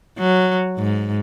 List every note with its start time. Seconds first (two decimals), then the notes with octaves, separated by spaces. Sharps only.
0.19 F#3
0.78 G#2